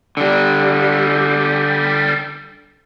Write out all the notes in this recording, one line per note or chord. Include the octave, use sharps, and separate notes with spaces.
D3 G3